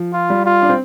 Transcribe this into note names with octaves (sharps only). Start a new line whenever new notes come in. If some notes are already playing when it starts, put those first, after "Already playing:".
Already playing: F3
F4
G3
F4
D4
C4